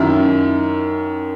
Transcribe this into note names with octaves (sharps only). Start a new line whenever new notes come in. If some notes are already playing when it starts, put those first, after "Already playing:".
Already playing: F#2 D#3 E4